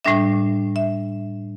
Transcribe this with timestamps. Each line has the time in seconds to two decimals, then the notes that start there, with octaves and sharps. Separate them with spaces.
0.05 A2 G3 D4 E5
0.76 E5